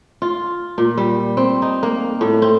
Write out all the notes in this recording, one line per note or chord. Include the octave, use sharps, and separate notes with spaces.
F4
A#2
G3
C4
D#4
A#3
A2
C4